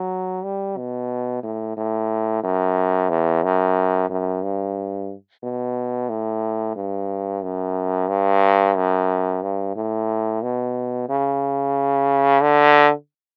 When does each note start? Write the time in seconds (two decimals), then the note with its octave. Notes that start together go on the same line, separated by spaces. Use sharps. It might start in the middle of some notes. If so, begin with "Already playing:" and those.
Already playing: F#3
0.44 G3
0.78 B2
1.43 A2
1.77 A2
2.43 F#2
3.10 E2
3.43 F#2
4.10 F#2
4.44 G2
5.43 B2
6.10 A2
6.76 G2
7.43 F#2
8.09 G2
8.77 F#2
9.43 G2
9.76 A2
10.43 B2
11.09 C#3
12.42 D3